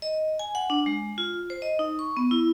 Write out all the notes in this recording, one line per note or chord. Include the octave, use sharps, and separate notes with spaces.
D#5
G#5
F#5
D4
G#3
F4
C5
D#5
D#4
C#6
B3
E4